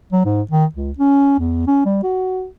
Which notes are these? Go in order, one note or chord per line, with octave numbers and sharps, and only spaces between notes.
F#3
G#2
D#3
C#2
C#4
E2
C#4
G3
F#4